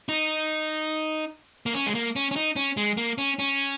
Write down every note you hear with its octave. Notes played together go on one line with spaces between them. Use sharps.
D#4
A#3
C#4
G#3
A#3
C#4
C#4
D#4
C#4
G#3
A#3
C#4
C#4